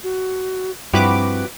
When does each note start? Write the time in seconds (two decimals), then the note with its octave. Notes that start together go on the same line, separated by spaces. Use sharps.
0.03 F#4
0.94 G2 F3 C4 E4 F#4 G4 B4 D6